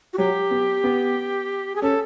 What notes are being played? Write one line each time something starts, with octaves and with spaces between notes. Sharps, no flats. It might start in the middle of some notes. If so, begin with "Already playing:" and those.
F#4
F#3 G4
B3
B3
G#4
C#4 A4